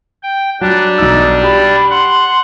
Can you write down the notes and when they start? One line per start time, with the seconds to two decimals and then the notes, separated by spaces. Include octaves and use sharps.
0.23 G5
0.61 F#3 G3 D4 F#6
0.98 B1 D#4 E6
1.43 G4 B5
1.91 F#5 C6